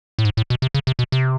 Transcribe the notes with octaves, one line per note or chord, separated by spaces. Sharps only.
A2
G#2
A2
B2
C3
C#3
C3
B2
C3